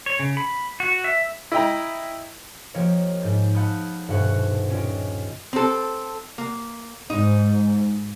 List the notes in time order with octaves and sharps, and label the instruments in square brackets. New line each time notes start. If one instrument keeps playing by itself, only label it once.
[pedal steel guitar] C#5
C#3
B5
F#4
E5
[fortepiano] E4 D#5 G5 A#5
[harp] F3 A#3 G4 A#4 C#5 D#5
G#2 G6 A6
F5 F#5 A5 B5 D#6 G6
D#1 G2 B2 C5 F#5 C#6
C#4 F4 G4 D#5
[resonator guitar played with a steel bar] C4 A4
A#3
[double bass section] G#2 [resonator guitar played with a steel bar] D#4